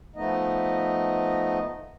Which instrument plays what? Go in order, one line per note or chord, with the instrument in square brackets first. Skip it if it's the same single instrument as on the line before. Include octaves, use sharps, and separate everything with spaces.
[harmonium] F3 A3 B3 D#4 D#5